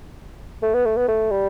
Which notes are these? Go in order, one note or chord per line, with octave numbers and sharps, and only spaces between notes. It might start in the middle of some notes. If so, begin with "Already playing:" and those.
A3
B3
A3
B3
A3
G3